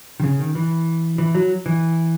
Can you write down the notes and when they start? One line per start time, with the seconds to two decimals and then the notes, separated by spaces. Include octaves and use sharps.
0.20 D#3
0.24 C#3
0.40 D#3
0.55 E3
1.18 E3
1.35 F#3
1.66 E3